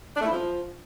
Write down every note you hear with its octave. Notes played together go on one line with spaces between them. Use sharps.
D4
A3
E4
F3